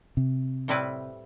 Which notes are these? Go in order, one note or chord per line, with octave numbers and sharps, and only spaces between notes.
C3
A2 G3 C4 E4 B4